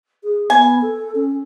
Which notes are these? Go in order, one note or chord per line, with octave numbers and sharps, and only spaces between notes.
G#4
B3 G#5
A4
C#4